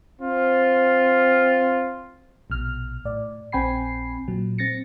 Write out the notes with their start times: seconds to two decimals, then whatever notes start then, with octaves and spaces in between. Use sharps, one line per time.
0.21 C4 F4
2.50 A#1 B2 F6
3.05 A2 D5
3.52 A#1 C4 G5 G#5 B5 C7
4.28 A#2 F#3
4.58 C4 A6 A#6 C#7